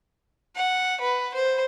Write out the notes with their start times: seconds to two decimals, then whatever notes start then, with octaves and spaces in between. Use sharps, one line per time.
0.56 F#5
1.01 B4
1.34 C5